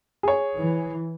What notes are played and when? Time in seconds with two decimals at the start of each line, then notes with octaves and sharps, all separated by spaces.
0.23 G#4 C#5
0.57 E3